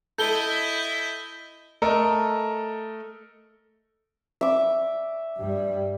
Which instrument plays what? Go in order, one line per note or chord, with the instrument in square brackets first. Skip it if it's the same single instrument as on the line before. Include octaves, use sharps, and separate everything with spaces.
[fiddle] E4 D#5 [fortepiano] A4 [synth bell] G6 G7
[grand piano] A3 A4 A#4 D#5
[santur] E5 D6
[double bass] G2 G3